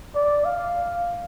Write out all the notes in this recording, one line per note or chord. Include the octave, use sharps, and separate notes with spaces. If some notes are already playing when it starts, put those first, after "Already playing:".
D5
F5